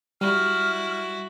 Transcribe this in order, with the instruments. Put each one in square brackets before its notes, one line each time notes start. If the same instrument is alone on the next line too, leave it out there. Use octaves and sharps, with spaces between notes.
[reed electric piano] G3 [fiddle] E4 F#4 [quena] F6